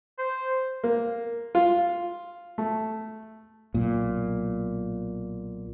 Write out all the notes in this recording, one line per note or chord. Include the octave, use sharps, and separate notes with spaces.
C5
A#3
F4
A3
B1 A#2